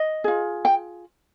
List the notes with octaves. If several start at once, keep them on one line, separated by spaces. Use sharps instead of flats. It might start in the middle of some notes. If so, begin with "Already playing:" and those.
Already playing: D#5
F4 G#4
G5